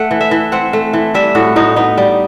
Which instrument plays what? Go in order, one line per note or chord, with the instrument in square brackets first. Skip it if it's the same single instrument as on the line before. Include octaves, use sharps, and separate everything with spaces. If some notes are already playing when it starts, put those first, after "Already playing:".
Already playing: [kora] A3 F#5
E3
E5
E3
C4 F#5
A3
E3
G3 E5
A2 F#4
A2 D#4
B3 D#4
G3